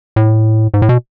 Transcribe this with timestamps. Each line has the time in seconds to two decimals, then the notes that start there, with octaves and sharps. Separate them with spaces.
0.16 A2
0.74 G#2
0.82 A2
0.89 B2